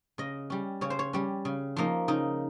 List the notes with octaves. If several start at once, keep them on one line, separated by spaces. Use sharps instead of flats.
C#3 D#5
G3 C#4
C#3 C#5
C5
C#5
G3 C#4
C#3
F3 A#3 D#4
C#3 D#4